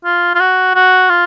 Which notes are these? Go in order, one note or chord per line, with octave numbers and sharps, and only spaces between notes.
F4
F4
F#4
F#4
F4